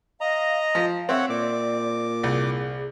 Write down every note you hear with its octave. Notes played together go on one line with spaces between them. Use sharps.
D#5 F5 A#5
F3 F5
C4 C#5 E5 F#5
A#2 D5 D6
C2 G#4